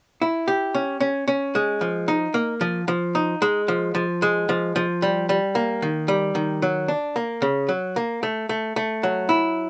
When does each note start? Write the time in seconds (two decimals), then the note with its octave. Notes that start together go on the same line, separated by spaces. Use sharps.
0.22 E4
0.48 G4
0.75 C#4
1.00 C#4
1.28 C#4
1.55 G#3
1.81 F3
2.08 D#4
2.34 A#3
2.61 F3
2.88 F3
3.15 D#4
3.42 G#3
3.68 F3
3.95 F3
4.22 G#3
4.49 F3
4.76 F3
5.02 G3
5.29 G3
5.55 A#3
5.82 D#3
6.08 G3
6.35 D#3
6.62 F#3
6.88 D4
7.16 A#3
7.42 C#3
7.69 F#3
7.96 A#3
8.23 A3
8.49 A3
8.76 A3
9.03 F#3
9.29 E4